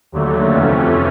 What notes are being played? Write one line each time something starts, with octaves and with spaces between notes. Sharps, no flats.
D#2 D3 F#3 A3
F2 C3 E3 A3 C#4